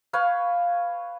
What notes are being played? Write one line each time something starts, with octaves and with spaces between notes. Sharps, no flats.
B4 C#5 F5